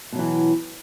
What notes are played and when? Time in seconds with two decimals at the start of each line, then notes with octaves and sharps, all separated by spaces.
0.12 B2
0.16 F#3
0.19 E3